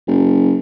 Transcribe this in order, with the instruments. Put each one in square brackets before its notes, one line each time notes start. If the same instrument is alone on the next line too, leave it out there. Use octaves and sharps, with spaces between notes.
[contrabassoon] F#1